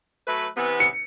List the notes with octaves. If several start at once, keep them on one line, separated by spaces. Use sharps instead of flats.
F#3 A3 B4
C3 E3 B3
C#7